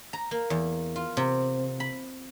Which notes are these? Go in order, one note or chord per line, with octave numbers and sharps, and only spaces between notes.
A#5
A#3
E2
F4
C3
B5